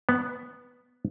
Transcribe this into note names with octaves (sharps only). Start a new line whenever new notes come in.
B3